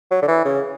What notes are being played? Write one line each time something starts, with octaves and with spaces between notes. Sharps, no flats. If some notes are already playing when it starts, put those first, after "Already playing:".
F#3
D3
E3
C#3